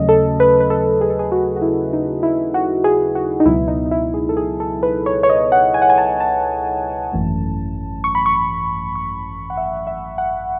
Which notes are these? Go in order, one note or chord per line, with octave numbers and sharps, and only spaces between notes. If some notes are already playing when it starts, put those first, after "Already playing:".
Already playing: D#2 C#3 F#3 A3 C#4 D#5
A4
B4
B4
A4
G#4
A4
G#4
F#4
F#4
E4
D#4
E4
F#4
G#4
F#4
D#4
C#2 B2 F#3 B3 E4
D#4
D#4
E4
G#4
A4
G#4
A4
B4
C#5
C#5
D#5
F#5
G#5
F#5
G#5
A5
A5
G#1 F#2 E3 A3 C#4
C#6
B5
C#6
C#6
F#5
E5
E5
F#5